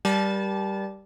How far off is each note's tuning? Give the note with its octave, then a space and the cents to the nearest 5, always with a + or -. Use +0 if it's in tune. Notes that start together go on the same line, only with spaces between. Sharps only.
G3 +0 A#4 +35 A5 -25